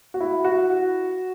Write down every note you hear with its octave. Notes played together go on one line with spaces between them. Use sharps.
F#4
E4
F#4